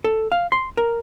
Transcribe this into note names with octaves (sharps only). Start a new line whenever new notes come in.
A4
F5
C6
A#4